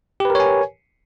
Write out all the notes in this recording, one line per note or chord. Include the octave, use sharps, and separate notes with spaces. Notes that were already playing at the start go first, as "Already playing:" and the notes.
G4 A#4 B4 C#5 G#5